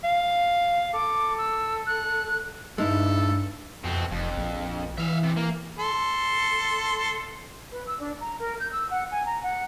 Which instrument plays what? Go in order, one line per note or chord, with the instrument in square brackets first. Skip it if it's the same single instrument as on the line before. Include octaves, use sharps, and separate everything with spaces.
[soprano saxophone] F5
[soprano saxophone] A4 [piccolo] D6
[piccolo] E6
F#6
[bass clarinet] G2 [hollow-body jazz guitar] G#3 D#4 E4 [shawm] A4
[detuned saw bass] F2 [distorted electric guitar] B2 C4
[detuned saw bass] F1 [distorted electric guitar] F2
[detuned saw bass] A#1
[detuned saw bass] E3 [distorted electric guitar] E5 F5
[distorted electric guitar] C3
A#3
[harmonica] A4 C6
[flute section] B4
E6
D4
A#5
A#4
G6
E6
F#5
G#5
A#5
F#5